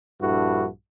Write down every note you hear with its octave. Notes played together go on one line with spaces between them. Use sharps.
A#1 G2 E4 F#4 A4